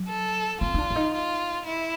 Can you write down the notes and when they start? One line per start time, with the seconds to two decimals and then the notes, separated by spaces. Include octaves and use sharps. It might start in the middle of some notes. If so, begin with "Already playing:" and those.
Already playing: F#3
0.09 A4
0.61 C4 F4
0.74 D#4
0.78 D4
0.91 D4
0.96 D#4
1.14 F4
1.66 E4